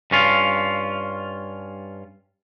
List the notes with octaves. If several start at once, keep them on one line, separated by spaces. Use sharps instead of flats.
G2 C#4 F4